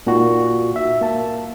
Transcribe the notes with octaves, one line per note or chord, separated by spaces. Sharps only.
A#2 A#3 D#4 F#4
E5
A#3 A5